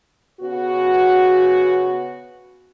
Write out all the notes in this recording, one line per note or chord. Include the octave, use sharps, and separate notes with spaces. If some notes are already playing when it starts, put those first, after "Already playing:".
C#3 B3 F#4